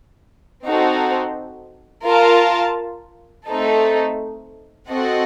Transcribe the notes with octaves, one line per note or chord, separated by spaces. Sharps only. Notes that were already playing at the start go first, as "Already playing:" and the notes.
C4 D#4 F#4 A4 C5
F4 A#4 F5 A5
A3 C4 D#4 A4
C4 F#4 A4 D#5 F#5